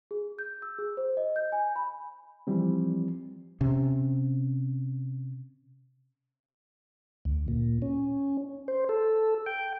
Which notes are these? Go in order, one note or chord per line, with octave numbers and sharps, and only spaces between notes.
G#4
G6
E6
G#4
C5
D#5
G6
G#5
B5
E3 F3 G3 C4
C3 C#4
D2
A#2
C#4
C5
A4
G5